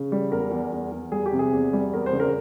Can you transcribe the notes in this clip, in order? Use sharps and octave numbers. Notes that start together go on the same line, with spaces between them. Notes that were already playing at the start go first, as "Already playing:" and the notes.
Already playing: C#3
G3
E2 A#4
E2
E2
E2
G3 G#4
G4
C3
G#4
E2
G3
E2 A#4
C5
C#3
A#4